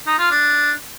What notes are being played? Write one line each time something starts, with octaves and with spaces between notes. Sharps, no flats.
D#4
F4
D4